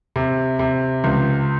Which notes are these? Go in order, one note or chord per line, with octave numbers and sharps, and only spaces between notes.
C3
C3
C#2